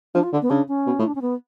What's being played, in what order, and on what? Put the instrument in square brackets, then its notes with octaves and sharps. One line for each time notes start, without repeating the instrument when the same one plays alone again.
[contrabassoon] F3 [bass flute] D4
[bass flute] F4
[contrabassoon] D3
[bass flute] B3
[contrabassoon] C#3 [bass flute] D4
[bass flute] C#4
[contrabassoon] B2
[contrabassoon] A2 [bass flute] F4
[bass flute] D4
C#4
B3